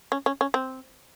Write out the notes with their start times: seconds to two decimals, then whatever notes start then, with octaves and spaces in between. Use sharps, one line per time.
0.12 C#4
0.26 C#4
0.41 C#4
0.54 C4